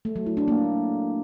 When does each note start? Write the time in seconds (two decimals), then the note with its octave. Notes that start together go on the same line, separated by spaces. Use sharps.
0.05 A3
0.16 F#3
0.26 E4
0.37 D4
0.48 A#3